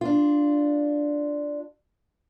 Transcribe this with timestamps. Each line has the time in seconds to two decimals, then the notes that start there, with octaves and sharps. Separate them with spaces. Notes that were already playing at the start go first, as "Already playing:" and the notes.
0.01 D4 F4